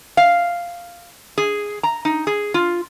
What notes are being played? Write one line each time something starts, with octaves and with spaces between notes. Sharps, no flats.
F5
G#4
A#5
D#4
G#4
F4